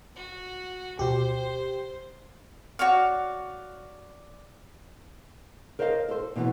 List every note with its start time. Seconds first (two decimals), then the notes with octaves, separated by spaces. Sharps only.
0.16 F#4
0.99 D2 B2 G4 C5
2.79 F#4 C#5 D5 F5
5.79 A#4 C5 C#5 D#5 F5
6.08 A4 C5
6.36 B2 E3 F#3 B3 C#4